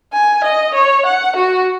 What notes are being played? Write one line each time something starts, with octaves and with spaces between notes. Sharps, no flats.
G#5
D#5
C#5
F#5
F#4